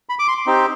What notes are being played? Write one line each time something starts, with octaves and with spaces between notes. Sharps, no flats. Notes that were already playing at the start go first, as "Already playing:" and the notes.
B5
D6
C6
C4 D#4 G4